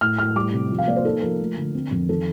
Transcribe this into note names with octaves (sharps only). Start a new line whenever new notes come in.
A2 F6
A2 F6
G3 D6
C3
F3
F5
A#3 D5
C5
D#4 A4
F3 A#4
A3
D3
C4
F2
D#3 A4